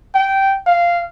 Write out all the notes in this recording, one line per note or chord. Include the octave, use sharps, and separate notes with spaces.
G5
F5